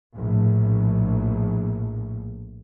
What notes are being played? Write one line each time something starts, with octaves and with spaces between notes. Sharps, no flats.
A#1 A2